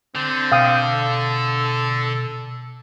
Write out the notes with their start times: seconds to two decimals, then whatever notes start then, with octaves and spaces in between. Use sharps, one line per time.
0.15 D3 C4
0.52 B2 F5 G5 D#6
0.82 A4